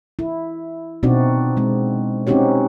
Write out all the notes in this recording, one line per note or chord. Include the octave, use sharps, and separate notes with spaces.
E4
B2 C4 D4 D#4 F#4 D5
G#3 C4
C4 C#4 D#4 F#4 G4 C#5